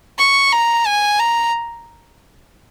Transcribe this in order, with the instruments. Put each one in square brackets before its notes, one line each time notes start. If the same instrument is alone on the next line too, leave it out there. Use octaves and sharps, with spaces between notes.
[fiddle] C#6
A#5
G#5
A#5